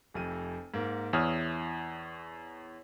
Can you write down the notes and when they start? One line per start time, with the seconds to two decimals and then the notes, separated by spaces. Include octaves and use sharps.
0.14 F1 F2 D#7
0.74 G#2 A#3
1.13 E2 E4 C#5 D#6 F6